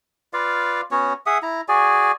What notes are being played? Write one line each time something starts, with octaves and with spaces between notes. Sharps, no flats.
F4 B4 D5 F5
B3 C#4 F#4 C#5
G#4 E5 F#5 D#6
E4 A#5
F#4 G#4 D5 G#5